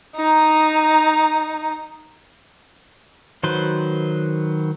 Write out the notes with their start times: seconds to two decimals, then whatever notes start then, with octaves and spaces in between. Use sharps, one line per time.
0.16 D#4 A#5
3.43 D#3 F#3 B4 C5